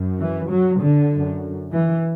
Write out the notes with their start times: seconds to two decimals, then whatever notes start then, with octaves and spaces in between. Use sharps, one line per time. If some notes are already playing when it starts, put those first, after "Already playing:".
Already playing: F#2
0.19 E3
0.49 F#3
0.80 D3
1.11 F#2
1.72 E3